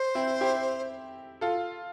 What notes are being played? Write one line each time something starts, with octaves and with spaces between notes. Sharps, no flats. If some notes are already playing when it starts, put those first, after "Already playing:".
Already playing: C5
C4 E4
E4 G4
F4 A4